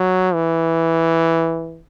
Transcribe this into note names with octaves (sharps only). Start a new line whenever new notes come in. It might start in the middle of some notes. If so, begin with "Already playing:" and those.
Already playing: F#3
E3